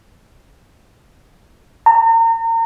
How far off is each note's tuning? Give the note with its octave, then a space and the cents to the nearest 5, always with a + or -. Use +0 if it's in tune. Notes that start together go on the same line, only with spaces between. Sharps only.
A#5 -35